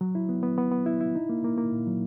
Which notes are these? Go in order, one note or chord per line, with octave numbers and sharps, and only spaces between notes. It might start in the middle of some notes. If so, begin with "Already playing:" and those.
F#3
E4
B3
B3
B3
B3
E4
E4
D#4
A#3
A#3
A#3
A#2
F#3